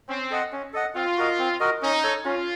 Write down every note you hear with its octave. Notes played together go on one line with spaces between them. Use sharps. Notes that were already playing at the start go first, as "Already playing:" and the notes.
C4 C#4
A4 D#5 F#5
C#4
A4 D#5 F#5
C4 F4
F#4 A#4 D#5
C4
F#4 A#4 D#5
C#4 D#4
A4 C#5
C#4 F4